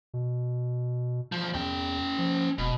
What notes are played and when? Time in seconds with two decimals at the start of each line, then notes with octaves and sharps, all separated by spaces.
0.14 B2
1.32 E2 F3
1.54 E2 C#4 G5
2.19 F3
2.58 E1 B2